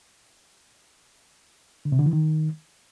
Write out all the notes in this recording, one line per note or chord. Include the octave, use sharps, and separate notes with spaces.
D3
C3
D3
E3
D#3